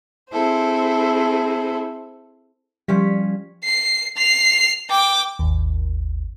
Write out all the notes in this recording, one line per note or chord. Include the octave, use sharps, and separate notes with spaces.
C4 E4 G#4 A4 C5
F3 G3 C#4 B6
C7
C7 F7
G5 D6
G#1 D#2